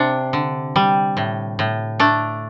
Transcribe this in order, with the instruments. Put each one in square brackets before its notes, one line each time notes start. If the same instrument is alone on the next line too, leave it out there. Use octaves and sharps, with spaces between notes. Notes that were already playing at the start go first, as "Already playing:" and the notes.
Already playing: [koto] C3 D4
D3
G3
A2
A2
A3 D4